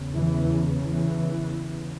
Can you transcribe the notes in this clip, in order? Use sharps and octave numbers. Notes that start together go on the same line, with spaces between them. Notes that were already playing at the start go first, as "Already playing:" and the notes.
Already playing: E2 C#3
E3
E3